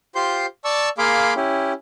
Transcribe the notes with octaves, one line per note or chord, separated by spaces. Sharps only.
F4 G4 C5 C6 G6
D5 A5 C#6 E6
A#3 G#4 F5 B5 C6 D6
C#4 E4 G4